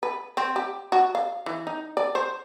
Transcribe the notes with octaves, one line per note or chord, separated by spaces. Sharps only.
B4
C4
G4
F#4
F5
E3
D#4
D5
C5